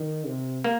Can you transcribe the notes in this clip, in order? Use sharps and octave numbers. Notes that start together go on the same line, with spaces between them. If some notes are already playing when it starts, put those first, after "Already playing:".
Already playing: D#3
C3
A#3